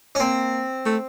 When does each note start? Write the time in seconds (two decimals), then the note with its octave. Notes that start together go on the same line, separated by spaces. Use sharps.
0.15 C#4
0.19 A#3 C4
0.85 A3